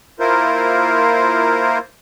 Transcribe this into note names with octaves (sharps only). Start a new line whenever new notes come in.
A#3 E4 F4 A#4 C5